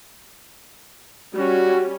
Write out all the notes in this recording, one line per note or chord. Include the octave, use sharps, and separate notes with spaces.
G3 C#4 F#4